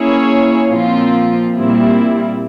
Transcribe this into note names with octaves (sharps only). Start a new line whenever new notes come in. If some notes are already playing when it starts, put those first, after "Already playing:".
Already playing: A#3 C#4 E4 G#4 C#5
A#2 F3 C4 F4
A#2 G3 C4 E4